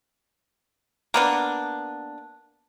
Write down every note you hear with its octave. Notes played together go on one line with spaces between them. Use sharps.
A#3 B3 D4